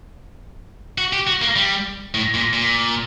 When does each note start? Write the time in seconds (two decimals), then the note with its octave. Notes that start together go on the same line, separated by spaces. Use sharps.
0.98 F#4
1.13 G4
1.27 F#4
1.42 A#3
1.56 G3
2.14 A2
2.34 A#2
2.53 A#2